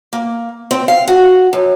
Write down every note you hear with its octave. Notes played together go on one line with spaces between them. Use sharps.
A#3
C4
F5
F#4
F#2